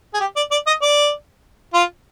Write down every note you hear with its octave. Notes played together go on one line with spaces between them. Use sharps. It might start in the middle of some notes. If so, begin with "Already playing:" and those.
G#4
G4
D5
D5
D#5
D5
F4